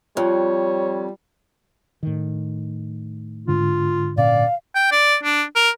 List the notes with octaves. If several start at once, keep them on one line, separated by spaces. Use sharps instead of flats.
F2 G3 C#5
A2 D#3
G#2 D3 F4
A#2 C#4 D5 F5
G5
D5
D4
A#4